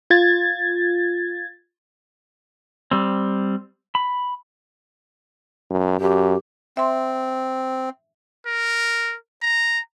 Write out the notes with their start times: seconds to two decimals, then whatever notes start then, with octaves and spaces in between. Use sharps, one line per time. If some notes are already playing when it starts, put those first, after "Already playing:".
0.10 F4 G#6 A6
2.91 G3 C4
3.95 B5
5.70 F#2
6.00 F#2 G4
6.77 C4 E5 C6
8.46 A#4
9.42 A#5